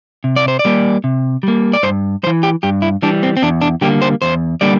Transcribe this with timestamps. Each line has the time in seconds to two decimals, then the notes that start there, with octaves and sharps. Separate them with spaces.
0.24 C3
0.36 D5
0.48 C5
0.59 D5
0.65 G3 A#3
1.04 C3
1.43 G3 A#3
1.73 D5
1.83 G2 C5
2.23 G3 C5
2.27 E3
2.43 G4
2.63 G2 G4
2.82 E4
3.02 E3 G3 D4
3.23 C4
3.37 C4
3.42 E2 D4
3.62 D4
3.81 D3 G3 A#3 G4
4.02 C5
4.22 E2 C5
4.61 D3 G3 A#3 D5